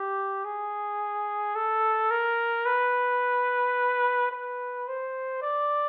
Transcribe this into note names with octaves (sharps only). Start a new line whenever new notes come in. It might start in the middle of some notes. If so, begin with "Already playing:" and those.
Already playing: G4
G#4
A4
A#4
B4
B4
C5
D5